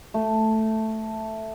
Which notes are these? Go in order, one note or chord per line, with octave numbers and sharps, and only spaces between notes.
A3